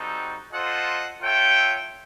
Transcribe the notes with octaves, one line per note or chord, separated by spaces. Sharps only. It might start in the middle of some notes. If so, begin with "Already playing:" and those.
Already playing: G3 C4 D#4 F#4 A4
F4 A4 C5 D#5 F#5
F4 A4 C#5 E5 G5